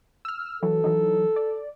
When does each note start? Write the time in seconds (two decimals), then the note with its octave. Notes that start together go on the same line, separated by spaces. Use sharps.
0.25 E6 F6
0.63 E3 F#3 A4
0.84 E3 F#3 D#4
1.36 D5